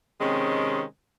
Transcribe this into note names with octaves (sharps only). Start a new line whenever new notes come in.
C3 D#3 G#3 C4 C#4